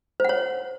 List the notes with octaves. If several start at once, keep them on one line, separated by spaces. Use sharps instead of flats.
C5 C#5 F#5